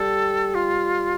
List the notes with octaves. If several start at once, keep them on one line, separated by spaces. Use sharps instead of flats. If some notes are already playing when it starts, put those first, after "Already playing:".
Already playing: G3 A4
F4